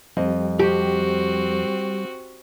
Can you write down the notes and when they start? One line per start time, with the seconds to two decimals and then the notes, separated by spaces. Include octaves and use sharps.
0.17 F2 G3 D#5
0.59 C4 F#4 G4